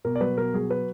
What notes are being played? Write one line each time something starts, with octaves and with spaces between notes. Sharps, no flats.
B2 A#4
D5
F#3 B4
B2 A#4
F#3 G#4
B4